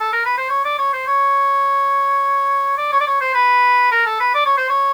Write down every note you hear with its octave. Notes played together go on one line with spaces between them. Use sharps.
A4
A#4
B4
C5
C#5
D5
C#5
C5
C#5
D5
C#5
D5
C#5
C5
B4
A#4
A4
B4
D5
C#5
C5
C#5